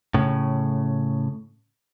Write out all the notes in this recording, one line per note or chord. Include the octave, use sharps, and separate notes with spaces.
A2 C#3